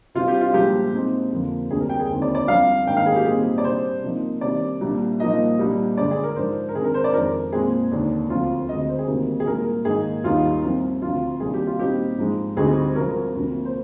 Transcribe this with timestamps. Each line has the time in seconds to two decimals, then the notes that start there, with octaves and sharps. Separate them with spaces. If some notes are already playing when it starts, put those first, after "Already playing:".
0.15 C3 G3 C4 F4
0.28 G4
0.41 F4
0.53 C2 A#2 F3 G#3 G4
0.93 A#2 G#3 C4 D#4
1.32 F2 D3 F3 A#3
1.70 D2 C3 G3 D4 G#4
1.80 A#4
1.89 G5
1.99 G#4
2.09 D#2 D3 G#3 C4
2.22 D5
2.35 D5
2.47 C2 C3 F3 F5
2.86 G#2 D#3 A#3 D#4 G5
2.97 F5
3.06 G#4
3.16 G4
3.26 A#2 G3 C4 D#4 G#4
3.58 D5
3.64 C3 G3 D4 C5
4.03 C3 F3 A#3 D#4
4.41 C3 D#3 G3 D4 D5
4.81 C2 A#2 G3 D4
5.19 C2 A#2 F3 A#3 D#4 D#5
5.59 C2 A#2 G3 D4
5.97 G2 D3 G#3 D5
6.11 G#4
6.24 A#4
6.36 G#2 F3 G#3 D4 C5
6.69 A#4
6.74 C3 D#3 G#3 D4 G#4
6.84 A#4
6.94 C5
7.04 D5
7.13 F2 D#3 G#3 D4 A#4
7.52 A#2 G#3 C4 G#4
7.91 D#2 D3 G#3 D4
8.30 D2 D3 F3 C4 F4
8.68 D2 D3 G#3 C4 D#5
8.89 C5
8.99 G#4
9.07 D2 C3 D#3 G3 A#3
9.40 G#4
9.46 C2 A#2 G#3 A#4
9.85 G#2 D#3 A#3 D#4 G#4
10.24 D#2 D#3 G3 A#3 D#4 F4
10.63 C2 C3 F3
11.02 D2 C3 F3 F4
11.40 C2 C3 D#3 A#3 D4 G#4
11.54 G4
11.67 F4
11.79 A#2 G3 C4 D#4 G4
12.18 G#2 F3 G#3
12.57 D2 D3 G3 C4 D#4 G#4
12.95 C2 C3 F3 G#3 A#4
13.35 D2 C3 F3 A#3
13.65 C5